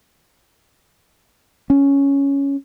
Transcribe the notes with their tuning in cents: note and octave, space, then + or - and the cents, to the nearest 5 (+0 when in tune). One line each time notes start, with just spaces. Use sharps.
C#4 +5